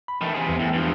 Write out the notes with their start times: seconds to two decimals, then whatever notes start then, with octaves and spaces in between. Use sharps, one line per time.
0.08 B5
0.21 D#3 E3 A3
0.34 C3 G#4
0.47 E2 E3
0.60 A2
0.74 G2 F3